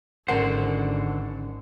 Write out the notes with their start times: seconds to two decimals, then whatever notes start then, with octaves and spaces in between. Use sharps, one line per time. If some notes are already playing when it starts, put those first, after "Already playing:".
0.28 G#1 D3 C#4 D4 A#4 C5 D5 F#5